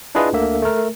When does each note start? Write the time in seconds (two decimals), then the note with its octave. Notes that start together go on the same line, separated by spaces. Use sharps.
0.15 D4 E4 F4 G#4 B4 D#5
0.33 D2 D3 A#3 E5
0.62 A3 A#4